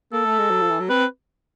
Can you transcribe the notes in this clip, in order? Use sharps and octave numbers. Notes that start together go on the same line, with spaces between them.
A#3 A4
A3
G#3
F#3
F3
E3
F#3
C4 B4